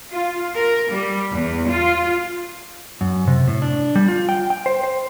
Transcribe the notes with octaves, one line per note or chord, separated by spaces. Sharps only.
F4
A#4
G3
E2
F4
F#2
C3
A2
D4
G3
F4
G5
G5
C5
C5